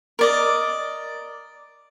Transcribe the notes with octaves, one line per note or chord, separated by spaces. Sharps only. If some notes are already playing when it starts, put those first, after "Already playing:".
A#4 D5 D#5